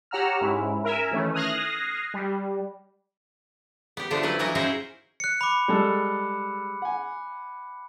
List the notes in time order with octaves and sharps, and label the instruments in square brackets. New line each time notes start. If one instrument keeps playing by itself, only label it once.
[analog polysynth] G4 C#5 F#5 A#5 E6 F6
G#2 C#4 E4
A#4 E5 G#5
D#3 E3 A3 C#4
D#6 F6 F#6 G#6 A#6 C7
G3
[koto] B3 G4
D3 F3 A3 B3 D4
F#3 A3 E4 B4
E3 F#3 A#3 F#4 A#4 D#5
C#4 D#4 E4 F#4 G#4 C5
[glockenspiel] F#6 C#7
B5 D6
[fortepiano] G3 G#3 A4
F#5 G#5